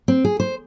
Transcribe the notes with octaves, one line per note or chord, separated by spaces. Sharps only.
C4
G#4
C5